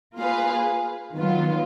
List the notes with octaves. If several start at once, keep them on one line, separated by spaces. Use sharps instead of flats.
A#3 F4 G#4 B4 F5
D#3 F#3 B3 F4